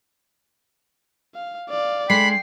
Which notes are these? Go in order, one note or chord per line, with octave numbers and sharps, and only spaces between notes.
F5
D5 F5
G#3 A3 D4 G5 B5 C7